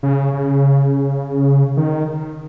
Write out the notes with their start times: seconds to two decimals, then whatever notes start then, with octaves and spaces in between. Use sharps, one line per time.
0.03 C#3
0.33 C#3
1.77 D#3